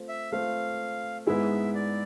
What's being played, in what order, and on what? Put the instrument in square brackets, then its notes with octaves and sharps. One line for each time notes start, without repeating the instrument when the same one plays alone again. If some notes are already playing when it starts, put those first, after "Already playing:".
Already playing: [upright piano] A3 C4 F4
[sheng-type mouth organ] E5
[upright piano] A3 C4 F4 [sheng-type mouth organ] F5
[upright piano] G#2 G#3 B3 E4 G#4 [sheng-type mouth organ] E5
[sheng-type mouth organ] D5